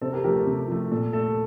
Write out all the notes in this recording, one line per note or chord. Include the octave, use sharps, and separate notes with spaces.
C3 A4 C5
G4 A#4
F3 A3 G4 A#4
A4
C3
F3 A3
A#2 A4
A3 A4